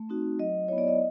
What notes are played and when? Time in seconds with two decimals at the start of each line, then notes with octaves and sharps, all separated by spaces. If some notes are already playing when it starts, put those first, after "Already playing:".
Already playing: A3
0.09 C4 D#4 F#4
0.39 F#3 D#5
0.68 B3 E4 C#5
0.78 D5
0.88 D#5